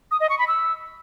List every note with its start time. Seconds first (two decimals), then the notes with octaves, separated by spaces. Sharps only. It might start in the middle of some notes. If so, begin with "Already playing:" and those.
0.11 D#6
0.20 D#5
0.30 C#6
0.39 B5
0.48 E6